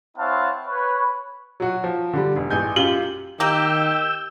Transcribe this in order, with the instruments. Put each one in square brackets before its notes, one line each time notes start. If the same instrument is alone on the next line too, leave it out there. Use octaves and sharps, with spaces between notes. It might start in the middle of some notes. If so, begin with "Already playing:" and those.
[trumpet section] C4 E4 C#5 F5 F#5 A5
B4 C#5
[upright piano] F#3 F#4
F3
D3 G3
E1
A1 G#3 G#5 G6
F#2 F4 G4 F#7 G7
[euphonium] D#3 [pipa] A#3 A#4 G5 [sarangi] G4 [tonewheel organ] E6 G6